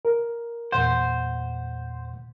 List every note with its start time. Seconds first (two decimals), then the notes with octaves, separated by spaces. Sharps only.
0.05 A#4
0.72 E2 A#2 C5 F#5